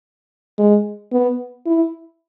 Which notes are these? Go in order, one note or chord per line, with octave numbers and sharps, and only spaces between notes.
G#3
B3
E4